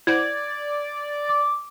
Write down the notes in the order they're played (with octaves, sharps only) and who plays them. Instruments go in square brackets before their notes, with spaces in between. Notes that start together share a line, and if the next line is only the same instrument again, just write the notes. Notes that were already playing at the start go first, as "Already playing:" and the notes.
[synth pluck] E4 C5 F#5 [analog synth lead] D5 [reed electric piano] G#6
[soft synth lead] D6